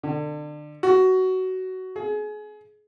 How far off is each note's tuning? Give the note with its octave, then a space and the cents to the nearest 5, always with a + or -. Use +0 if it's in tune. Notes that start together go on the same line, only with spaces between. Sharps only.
D3 +30
F#4 +15
G#4 +30